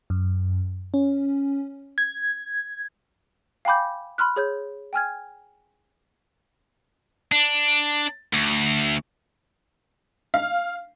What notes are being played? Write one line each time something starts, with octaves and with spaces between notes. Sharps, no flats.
F#2
C#4
G#6
F5 G5 G#5 B5 D6 G6
B5 C6 F6 F#6
G#4 C#5 G6
G5 G#5 F6 G#6
D4
D2
F5